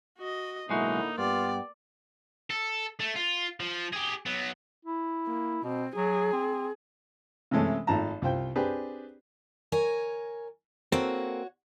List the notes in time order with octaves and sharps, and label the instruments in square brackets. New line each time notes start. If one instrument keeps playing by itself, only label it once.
[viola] F#4 D#5
[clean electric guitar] B1 G#3 F#4 [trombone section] A2 D3 E4 [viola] A#3 [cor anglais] D#4
[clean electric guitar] G2 [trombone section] B3 G4 [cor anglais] F4 [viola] D5
[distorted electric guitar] A4
A3
F4
F3
G4 G#4
F#3 B3
[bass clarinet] E4
[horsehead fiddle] A#3
[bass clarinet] B2 [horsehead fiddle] C4
[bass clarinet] F#3 [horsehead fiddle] G#4
[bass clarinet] C4
[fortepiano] C3 E3 G#3 A3 C#4
G#1 F3 A3 A5 A#5
C2 F4 C5 G5
C4 D4 G4 G#4 B4
[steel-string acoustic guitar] A#4 C#5 G#5
[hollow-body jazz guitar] A#3 C4 A4 [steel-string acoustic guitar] F#4 C#5